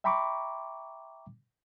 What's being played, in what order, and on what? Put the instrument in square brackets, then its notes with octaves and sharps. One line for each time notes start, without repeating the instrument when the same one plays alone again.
[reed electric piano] E5 G5 A#5 B5 C#6 D6